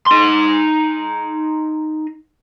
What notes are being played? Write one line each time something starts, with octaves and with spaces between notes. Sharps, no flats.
D#4 C6